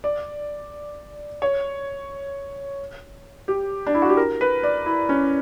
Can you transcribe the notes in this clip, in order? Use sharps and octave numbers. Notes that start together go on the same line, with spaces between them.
D5
C#5
G4
D4
E4
F#4
G4
A#4
B4
D5
E4
C#4